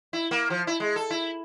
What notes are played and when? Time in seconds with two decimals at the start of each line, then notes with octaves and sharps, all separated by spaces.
0.13 E4
0.31 A#3
0.50 F3
0.67 E4
0.80 G#3
0.96 A4
1.10 E4